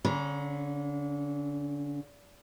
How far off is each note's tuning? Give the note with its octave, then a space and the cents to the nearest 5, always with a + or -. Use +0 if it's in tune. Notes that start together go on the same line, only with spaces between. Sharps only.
D3 -30 C#4 +0 A#5 +40